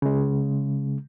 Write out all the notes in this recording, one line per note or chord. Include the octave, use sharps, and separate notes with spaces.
C#3 G#3